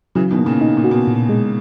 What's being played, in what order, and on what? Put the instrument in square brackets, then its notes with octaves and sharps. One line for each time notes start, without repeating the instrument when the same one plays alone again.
[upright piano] C#3 E3 [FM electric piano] F#3
[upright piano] B2 D#3
[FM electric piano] A#3
[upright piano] A#2 C#3
[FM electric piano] D#4
[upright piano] A#2
[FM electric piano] F#4
[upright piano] B2
[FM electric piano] A#2
G#3